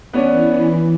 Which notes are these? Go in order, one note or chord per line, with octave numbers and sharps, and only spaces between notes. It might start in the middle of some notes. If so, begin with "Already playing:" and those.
E3 B3 C#4 D4